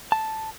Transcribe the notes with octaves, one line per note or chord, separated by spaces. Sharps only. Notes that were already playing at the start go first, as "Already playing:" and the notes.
A5